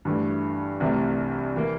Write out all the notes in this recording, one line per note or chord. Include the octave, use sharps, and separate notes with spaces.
G2 E3 A3
C2 C3 E3 A3
E3 A#3